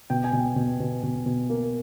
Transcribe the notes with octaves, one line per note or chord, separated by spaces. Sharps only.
B2 G5
G#5
B2
G5
B2
B2
B2
B2
A#3